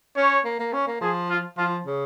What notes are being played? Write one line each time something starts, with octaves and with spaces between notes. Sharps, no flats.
C#4 C#5
A#3
A#3
C#4
A#3
F3 G#4
F4
F3 F4
C#3